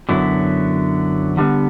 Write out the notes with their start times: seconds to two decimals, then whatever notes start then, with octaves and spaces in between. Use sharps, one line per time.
0.09 F#2 D3 F#3 B3 E4
1.37 D3 G3 B3